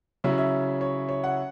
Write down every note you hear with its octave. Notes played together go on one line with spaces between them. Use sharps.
C#3 F#3 C#4 E4 E5
E5
C#5
C#5
F#5